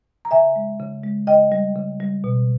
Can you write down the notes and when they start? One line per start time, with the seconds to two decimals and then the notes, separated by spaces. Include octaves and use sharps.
0.25 A#5
0.31 C#3 E5 G#5
0.56 G#3
0.80 C#3
1.04 G#3
1.27 C#3 D#5 G5
1.52 G3
1.76 C#3
2.00 G3
2.24 B2